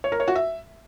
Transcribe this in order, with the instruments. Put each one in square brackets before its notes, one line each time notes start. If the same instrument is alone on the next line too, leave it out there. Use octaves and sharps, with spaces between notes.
[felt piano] C#5
A#4
C#5
F#4
E5